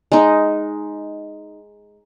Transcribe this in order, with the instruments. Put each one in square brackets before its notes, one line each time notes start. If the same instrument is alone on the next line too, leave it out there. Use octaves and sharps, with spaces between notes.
[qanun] G#3 D#4